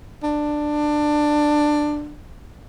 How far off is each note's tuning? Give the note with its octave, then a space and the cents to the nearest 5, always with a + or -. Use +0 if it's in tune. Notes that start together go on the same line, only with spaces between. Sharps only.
D4 +15